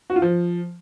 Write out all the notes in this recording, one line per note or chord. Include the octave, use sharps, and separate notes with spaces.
F#4
F4
F3